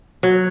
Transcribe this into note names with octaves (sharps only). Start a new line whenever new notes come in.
F#3